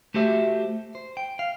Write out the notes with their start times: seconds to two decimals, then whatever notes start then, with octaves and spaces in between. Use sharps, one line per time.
0.14 A3 F#4 G4 A4 C5 E5
0.95 C5
1.17 G5
1.39 F5